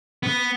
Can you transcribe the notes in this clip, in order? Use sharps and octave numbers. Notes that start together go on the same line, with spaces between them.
B3